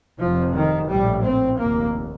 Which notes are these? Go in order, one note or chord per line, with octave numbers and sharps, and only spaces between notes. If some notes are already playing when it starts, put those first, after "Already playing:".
F1 F2 C3 F3
D#3
A#1 A2 G3
C4
F1 D#2 A#3